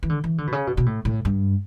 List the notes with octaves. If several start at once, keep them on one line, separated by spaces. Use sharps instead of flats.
E3
D3
E3
D3
B2
C#3
B2
B2
A2
A2
G2